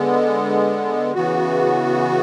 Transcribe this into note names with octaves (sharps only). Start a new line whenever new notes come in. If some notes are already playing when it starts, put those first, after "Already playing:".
Already playing: D3 G#3 B3
C#3 E3 B3 F#4